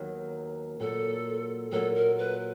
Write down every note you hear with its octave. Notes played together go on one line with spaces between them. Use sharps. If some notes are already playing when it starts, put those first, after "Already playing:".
Already playing: D#2 D#3 F#3 B3
A#2 F#3 A#3 A4
A#2 F#3 A#3 A4
A#4
B4